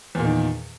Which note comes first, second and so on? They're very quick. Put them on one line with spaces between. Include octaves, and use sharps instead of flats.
E2 A#2 D#3